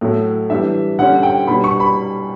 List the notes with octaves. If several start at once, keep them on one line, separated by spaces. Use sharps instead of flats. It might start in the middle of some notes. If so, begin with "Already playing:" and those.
A2 F#3 A3
E3 G3 D4 E5
D3 G3 C#4 F#5
G5
B2 G3 D4 B5
C#6
B5